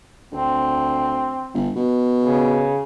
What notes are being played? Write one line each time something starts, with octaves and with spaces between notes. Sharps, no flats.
D2 C4
G1
B2
C#3